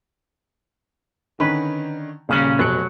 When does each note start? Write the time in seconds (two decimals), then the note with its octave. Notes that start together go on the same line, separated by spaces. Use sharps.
1.40 D3 D#3 C#4 B4
2.29 D#1 A#2 C#3 C#4 F#6 F#7
2.59 F1 B2 F#3 C#7